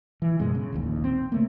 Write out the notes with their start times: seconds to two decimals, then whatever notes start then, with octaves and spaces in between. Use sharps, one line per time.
0.22 E3
0.39 F#2 B2 G#3
0.55 C#3
0.72 D1 A#1 D#2
1.04 C4
1.32 C#3 A3 A#3